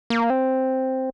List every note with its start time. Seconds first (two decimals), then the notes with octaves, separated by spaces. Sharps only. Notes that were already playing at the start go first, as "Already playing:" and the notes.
0.10 A#3
0.30 C4